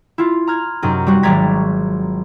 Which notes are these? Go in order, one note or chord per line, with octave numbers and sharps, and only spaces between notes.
E4 F4
A#5 F6 G#6
F#2 C3 D#4
G3 C4 F#4
G#1 F#3 D5 A#5 G#6 B6